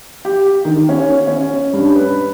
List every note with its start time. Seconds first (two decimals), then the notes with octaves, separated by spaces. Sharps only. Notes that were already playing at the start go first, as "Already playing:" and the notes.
0.25 G4
0.65 D#3
0.89 C#4
1.27 C#4
1.73 G2
1.95 B4